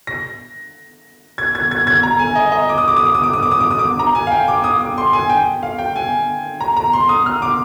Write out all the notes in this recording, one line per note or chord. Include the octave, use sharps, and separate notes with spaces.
A#6
G#6
G#6
G#6
G#6
A#5
G#5
D#5
D#5
D6
D#6
D6
D#6
D6
D#6
D6
D#6
D6
D#6
D6
D#6
D6
A#5
G#5
F5
G5
D6
D#6
D6
C6
G#5
G5
F5
G5
G#5
A#5
A#5
C6
D#6
F6
D6